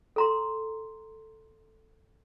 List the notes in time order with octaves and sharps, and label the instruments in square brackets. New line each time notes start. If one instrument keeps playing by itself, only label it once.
[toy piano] A4 A#5 C6